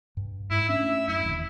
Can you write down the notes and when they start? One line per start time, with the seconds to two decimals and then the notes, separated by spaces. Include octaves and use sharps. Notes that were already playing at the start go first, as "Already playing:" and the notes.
0.17 G2
0.51 G#2 E4
0.69 A3 C#4 D4 E5
1.08 F#2 E4
1.25 E1 D#2